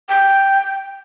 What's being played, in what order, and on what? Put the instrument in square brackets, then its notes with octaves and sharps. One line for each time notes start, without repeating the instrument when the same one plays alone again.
[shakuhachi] G5